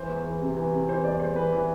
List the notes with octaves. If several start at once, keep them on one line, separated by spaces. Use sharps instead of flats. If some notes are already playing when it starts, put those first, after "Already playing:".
Already playing: E3 C5
E2
E3
C3
E3
C3
E3 C5
E2 D5
E2 C5
E3 B4
E3